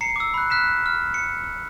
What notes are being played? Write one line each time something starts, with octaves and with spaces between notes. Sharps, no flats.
A#5 C7 C#7
D6 E6
B5 F#6
F6 F#6 B6 E7
F6
C#7